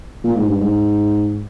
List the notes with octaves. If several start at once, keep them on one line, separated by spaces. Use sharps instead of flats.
A#2
G#2
G2
G#2